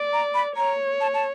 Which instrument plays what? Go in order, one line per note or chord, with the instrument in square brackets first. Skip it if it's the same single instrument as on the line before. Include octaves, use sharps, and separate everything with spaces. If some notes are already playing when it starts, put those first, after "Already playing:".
Already playing: [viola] D5
[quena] A#5
B5
[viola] C#5 [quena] A#5
[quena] A5
A5